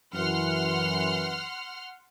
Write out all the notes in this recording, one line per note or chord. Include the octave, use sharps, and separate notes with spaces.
F#2 E3 F#5 C6 F6